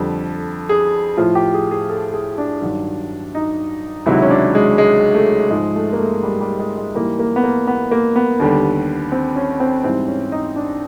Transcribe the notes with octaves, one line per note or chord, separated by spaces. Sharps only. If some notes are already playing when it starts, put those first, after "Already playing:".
Already playing: F2 D3 G3 A4
G#4
A2 F3 F4
G4
G#4
G#4
A4
G#4
D4
G2 D#3 F#3
D#4
C#2 C3 D#3 F#3 E4
C#4
D4
G#3
G#3
A3
G#2 F3 G#3
A3
A#3
A3
G3
G3
G#3
G#3
G#2 E3 G3 A#3
A#3
B3
A#3
B3
A#3
B3
D#2 D3 G3
C4
C#4
C4
G#2 E3 G3 C4
C#4
D#4
D4